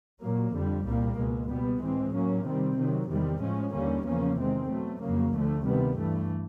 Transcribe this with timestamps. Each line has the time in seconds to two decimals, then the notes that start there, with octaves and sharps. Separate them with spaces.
0.21 A#2 F#3 A#3
0.53 F2 D3 G3
0.85 C2 A#2 G3 A#3
1.17 C#2 B2 G#3
1.49 B2 G3 B3
1.81 A2 E3 G#3 C4
2.12 A2 F#3 A#3 C#4
2.44 C3 D#3 G3 C4
2.77 C3 D#3 F#3
3.09 E2 C3 D#3 G3
3.40 A2 F3 G#3 C#4
3.72 D#2 D3 G3 A#3 C#4
4.05 E2 C#3 F3 A#3 C#4
4.37 C3 D#3 G#3 C4
4.69 B2 F#3 A3
5.01 F2 C#3 F#3 A#3
5.33 D2 D3 F3 A3
5.65 C3 D#3 G3 B3
5.97 G2 E3 A3